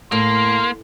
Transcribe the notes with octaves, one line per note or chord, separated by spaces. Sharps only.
A2 A#3 C6